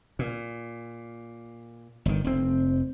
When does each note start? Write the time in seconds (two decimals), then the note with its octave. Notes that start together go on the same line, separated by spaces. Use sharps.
0.19 A#2
2.05 G1 D#3
2.24 F1 C4